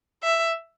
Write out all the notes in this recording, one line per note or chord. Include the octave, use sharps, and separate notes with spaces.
E5